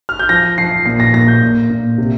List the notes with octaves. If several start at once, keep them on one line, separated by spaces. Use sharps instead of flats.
F6
G6
F3 A#6
F3 C7
A#2 C7
A#6
A#2 A#6
G6
A#2
A#2
C3